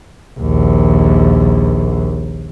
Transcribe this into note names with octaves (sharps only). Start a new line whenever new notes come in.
A#1 D#2